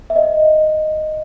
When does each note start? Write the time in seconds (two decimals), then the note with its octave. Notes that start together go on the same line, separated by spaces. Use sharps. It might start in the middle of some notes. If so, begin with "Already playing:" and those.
0.10 E5
0.16 D#5